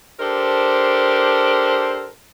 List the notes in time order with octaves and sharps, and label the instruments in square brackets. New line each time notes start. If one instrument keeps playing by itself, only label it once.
[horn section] D4 G4 A4 A#4 C5